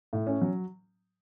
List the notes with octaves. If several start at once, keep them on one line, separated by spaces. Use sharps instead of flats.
A2
C#4
F#3